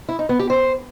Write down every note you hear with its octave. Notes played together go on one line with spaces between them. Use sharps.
E4
D#4
B3
G4
C5